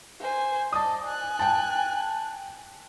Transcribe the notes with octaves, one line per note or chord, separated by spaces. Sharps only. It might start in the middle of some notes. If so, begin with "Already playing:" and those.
C5 G#5
D5 D#5 A5 D#6
G#5 F#6
G5 A5